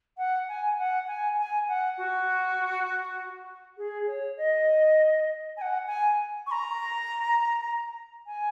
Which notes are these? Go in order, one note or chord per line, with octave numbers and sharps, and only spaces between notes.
F#5
G#5
F#5
G#5
G#5
F#5
F#4
G#4
C#5
D#5
G#5
F#5
G#5
C#6
A#5
G#5